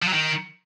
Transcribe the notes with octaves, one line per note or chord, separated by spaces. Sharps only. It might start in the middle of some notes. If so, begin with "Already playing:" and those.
F3
F#3
D#3